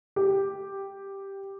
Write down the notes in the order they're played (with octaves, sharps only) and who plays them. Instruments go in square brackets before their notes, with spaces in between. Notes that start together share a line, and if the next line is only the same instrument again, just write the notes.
[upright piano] G4